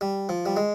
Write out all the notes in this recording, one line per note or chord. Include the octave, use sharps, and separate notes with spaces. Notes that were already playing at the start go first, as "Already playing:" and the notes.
G3
F3
G3
G#3